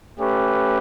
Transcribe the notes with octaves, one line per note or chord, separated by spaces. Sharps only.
A3 C#4 G4 B4